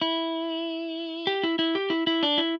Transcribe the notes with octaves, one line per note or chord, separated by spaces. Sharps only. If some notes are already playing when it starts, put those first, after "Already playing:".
E4
G4
E4
E4
G4
E4
E4
D4
E4